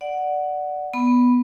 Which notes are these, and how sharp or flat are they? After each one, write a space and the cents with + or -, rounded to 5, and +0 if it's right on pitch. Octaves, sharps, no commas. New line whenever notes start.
D5 +0 F#5 +0
B3 +0 B5 +0